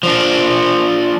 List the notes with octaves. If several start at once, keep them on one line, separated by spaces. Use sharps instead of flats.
F3 D4